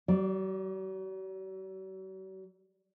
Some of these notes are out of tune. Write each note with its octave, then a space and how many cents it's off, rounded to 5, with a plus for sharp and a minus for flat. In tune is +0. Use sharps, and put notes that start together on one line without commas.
F#3 +45 D5 +0